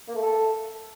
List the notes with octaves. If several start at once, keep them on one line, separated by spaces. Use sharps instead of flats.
A#3
A3
A4